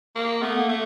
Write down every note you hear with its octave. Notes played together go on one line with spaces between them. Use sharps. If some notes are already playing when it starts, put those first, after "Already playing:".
A#3
A3 B3
A#3
A3